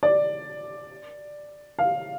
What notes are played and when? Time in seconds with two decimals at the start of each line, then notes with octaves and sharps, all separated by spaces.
0.03 D5
1.79 F5